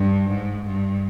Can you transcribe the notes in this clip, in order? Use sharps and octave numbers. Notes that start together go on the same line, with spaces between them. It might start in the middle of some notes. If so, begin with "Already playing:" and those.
Already playing: G2
G#2
G2